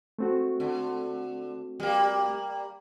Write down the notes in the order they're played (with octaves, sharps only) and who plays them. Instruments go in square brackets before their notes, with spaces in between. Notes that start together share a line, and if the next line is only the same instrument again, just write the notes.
[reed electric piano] A3 C4 F#4
[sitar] D3
G3 A#3